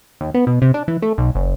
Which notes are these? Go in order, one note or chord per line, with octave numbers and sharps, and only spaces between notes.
D#2
B3
B2
C3
D4
E3
A3
B1
F#1